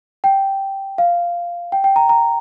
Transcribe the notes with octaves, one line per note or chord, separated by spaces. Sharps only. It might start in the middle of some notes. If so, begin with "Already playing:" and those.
G5
F5
G5
G5
A#5
A#5